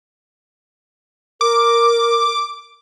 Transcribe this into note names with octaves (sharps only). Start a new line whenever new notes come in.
A#4 D6